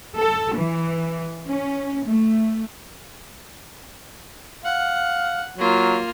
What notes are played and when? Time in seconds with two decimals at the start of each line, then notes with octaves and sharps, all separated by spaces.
0.16 A4
0.55 E3
1.47 C#4
2.07 A3
4.65 F5 F#5
5.58 F#3 A#3 F4